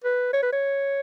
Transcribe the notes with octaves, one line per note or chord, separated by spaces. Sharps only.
B4
C#5
B4
C#5